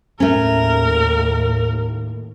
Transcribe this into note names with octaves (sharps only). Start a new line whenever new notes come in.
D#2 A2 A3 C#4 A#4